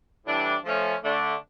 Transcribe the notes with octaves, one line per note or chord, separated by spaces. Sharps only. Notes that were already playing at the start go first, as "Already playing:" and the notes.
A2 E3 G3 D4
F3 A3 C#4
D3 A3 D4